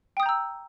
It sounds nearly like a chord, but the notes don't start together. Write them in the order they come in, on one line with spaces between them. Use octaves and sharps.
G5 D#6 G6 A#5 E6